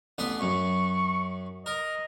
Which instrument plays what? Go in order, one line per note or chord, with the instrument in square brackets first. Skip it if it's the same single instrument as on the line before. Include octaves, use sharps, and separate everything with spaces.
[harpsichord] A1 B3 C6
[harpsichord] F#2 [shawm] C#6
[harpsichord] A#4 [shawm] D#5